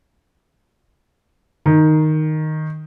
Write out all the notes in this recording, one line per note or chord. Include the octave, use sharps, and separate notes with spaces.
D#3